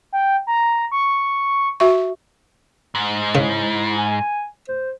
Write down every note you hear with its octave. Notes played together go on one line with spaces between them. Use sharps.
G5
A#5
C#6
F#4 E5 C#6
G#2
C#3 E4
G#5
C5